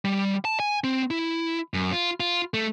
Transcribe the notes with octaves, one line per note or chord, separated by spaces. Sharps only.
G3
A5
G#5
C4
E4
F#2
F4
F4
A3